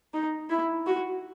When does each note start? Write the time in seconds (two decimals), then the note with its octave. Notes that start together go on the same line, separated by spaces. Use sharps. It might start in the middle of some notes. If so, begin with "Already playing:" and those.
0.14 D#4
0.50 E4
0.87 F#4